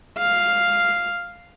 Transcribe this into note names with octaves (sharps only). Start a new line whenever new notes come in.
F5